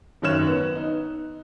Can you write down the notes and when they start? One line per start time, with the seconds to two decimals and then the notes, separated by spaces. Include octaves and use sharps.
0.22 G#1 F#2 D#3 C#5 F#6 E7
0.47 B3
0.75 D#4